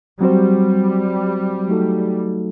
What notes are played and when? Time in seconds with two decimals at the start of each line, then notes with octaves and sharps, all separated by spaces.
0.20 F#3 G3 C4 F#4 C5
1.68 F#3 A3 D#4 F#4 A4